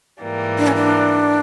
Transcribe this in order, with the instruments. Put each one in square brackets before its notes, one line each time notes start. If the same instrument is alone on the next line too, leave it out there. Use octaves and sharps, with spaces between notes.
[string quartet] G#2 E3 G3 A#3
[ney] D4
C#4
D4